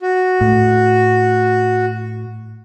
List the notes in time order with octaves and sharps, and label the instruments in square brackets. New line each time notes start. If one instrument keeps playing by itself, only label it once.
[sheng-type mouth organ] F#4
[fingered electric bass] A2